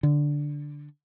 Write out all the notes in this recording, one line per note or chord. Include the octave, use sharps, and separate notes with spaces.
D3